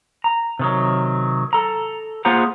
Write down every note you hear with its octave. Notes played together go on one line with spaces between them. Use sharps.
A#5
C3 D#3 F#3
A4 A#5
A#3 F4 G#4 C5 F#5 A#5